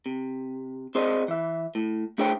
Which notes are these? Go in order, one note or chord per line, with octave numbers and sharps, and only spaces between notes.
C3
C4 G#4 C5 D5 D#5
E3 E5
A2
A3 D4 G#4 C5 C#5 G5